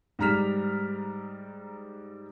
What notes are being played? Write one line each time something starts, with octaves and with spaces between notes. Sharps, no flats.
G#2 G3 A#5 F6 B6 F7